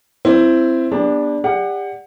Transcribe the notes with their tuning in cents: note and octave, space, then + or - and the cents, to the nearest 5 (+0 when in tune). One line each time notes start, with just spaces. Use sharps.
C4 +0 E4 +20
B3 -25 D4 +0 G4 +35
G4 +35 D5 +0 F#5 +0